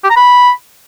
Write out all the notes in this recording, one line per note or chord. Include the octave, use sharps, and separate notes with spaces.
G4
A#5
B5